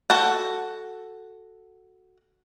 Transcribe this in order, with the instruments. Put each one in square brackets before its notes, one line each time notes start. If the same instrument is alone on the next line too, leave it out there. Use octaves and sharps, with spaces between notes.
[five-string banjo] F#4 A4 F#5